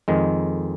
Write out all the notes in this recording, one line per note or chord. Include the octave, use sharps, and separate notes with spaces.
F2 D#3 G#3